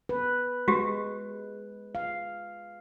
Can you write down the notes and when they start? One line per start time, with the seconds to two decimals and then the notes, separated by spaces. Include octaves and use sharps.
0.09 B4
0.68 G#3 F#4 G4
1.95 F5